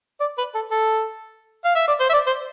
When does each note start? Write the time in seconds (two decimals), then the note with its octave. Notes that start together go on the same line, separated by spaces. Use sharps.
0.20 D5
0.38 B4
0.54 A4
0.71 A4
1.64 F5
1.75 E5
1.88 D5
2.00 C5
2.09 E5
2.13 D5
2.26 C5